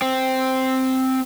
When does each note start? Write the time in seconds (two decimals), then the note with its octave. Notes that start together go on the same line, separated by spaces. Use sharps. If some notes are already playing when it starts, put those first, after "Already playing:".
0.02 C4